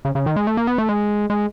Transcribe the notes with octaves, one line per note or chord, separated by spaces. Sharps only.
C#3
C#3
D#3
G#3
A3
A#3
B3
A3
G#3
G#3